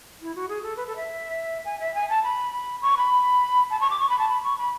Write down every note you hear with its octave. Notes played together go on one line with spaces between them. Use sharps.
E4
F#4
G#4
A4
B4
A4
E5
G#5
E5
G#5
A5
B5
C#6
B5
A5
C#6
D6
C#6
B5
A5
B5
C#6
B5